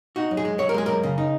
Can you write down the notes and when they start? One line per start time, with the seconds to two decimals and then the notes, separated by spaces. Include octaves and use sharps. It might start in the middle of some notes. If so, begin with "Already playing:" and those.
0.16 D#4 F#4
0.31 F#2
0.37 G#4
0.45 G#3
0.59 F#2 C#5
0.69 A#4
0.74 G#3 G#4
0.86 F#2 A#4
1.03 C#3
1.18 D#4